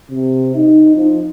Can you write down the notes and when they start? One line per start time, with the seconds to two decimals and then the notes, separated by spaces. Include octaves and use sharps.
0.10 C3
0.56 D#4
0.96 F3